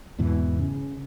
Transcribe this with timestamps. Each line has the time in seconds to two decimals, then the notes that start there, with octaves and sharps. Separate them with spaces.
0.18 E2 G#2 B2 E3
0.59 C#3